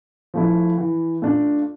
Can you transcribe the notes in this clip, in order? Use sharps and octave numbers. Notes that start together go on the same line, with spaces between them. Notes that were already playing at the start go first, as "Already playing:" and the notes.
F3 A3 E4
E3
A3 D4 F4